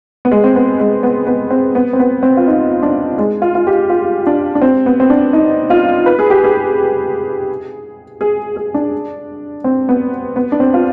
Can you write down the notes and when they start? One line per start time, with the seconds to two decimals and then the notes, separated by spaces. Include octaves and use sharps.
0.25 B3
0.31 G#3
0.44 C4
0.55 B3
0.80 G#3
1.03 B3
1.27 B3
1.51 C4
1.75 B3
1.93 C4
1.99 B3
2.23 C4
2.37 F4
2.47 D#4
2.83 D4
3.18 G#3
3.42 F4
3.55 F4
3.67 G4
3.90 F4
4.27 D4
4.55 D4
4.62 C4
4.86 B3
5.00 C4
5.10 D4
5.33 D#4
5.70 F4
6.06 B4
6.19 G#4
6.30 G4
6.44 G#4
8.21 G#4
8.56 G#4
8.74 D4
9.64 C4
9.89 B3
10.36 B3
10.52 D4
10.60 C4
10.74 F4